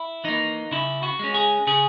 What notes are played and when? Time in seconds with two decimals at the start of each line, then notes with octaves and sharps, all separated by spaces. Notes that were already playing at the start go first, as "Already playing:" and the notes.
Already playing: E4
0.24 E3 A#3 D#4
0.71 C#3 E4
1.03 F#4
1.19 G#3 C#4
1.34 G#4
1.67 C#3 G#4